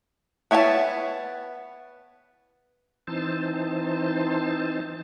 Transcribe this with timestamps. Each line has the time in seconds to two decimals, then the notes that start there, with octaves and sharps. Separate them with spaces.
0.51 B3 E4 C#5 E5 A5
3.07 E3 C4 D#4 C5 A5